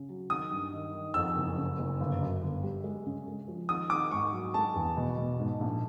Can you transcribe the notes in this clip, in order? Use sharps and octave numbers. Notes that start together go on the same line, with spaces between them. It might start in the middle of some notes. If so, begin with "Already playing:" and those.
Already playing: C#3
F#3
D#3 D#6
G2
D#3
D#3
F2 E6
F#1
C#3
F#1
G1
F#2
G1
G3
G#3
C#3
G#3
F3
D#3 D#6
D#3 D6
G#2 C#6
F#3
G#3 A5
E2
B2
B2
G#2
A#1